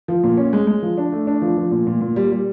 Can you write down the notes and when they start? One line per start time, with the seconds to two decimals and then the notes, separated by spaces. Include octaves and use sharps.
0.08 F3
0.24 A#2
0.37 C#4
0.53 G#3
0.67 G#3
0.82 F3
0.98 D4
1.12 A3
1.27 D4
1.42 F3
1.57 F3
1.71 A#2
1.87 A#2
2.01 A#2
2.16 G3
2.32 G3